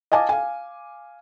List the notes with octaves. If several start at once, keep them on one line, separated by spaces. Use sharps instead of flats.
D#5 F5 G#5 A5 D6
F5 G#5